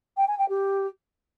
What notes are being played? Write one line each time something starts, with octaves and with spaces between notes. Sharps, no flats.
G5
G#5
G5
G4